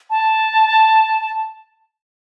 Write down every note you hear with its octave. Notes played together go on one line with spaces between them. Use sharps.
A5